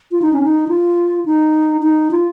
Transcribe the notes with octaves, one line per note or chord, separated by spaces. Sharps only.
F4
D#4
C#4
D#4
F4
D#4
D#4
F4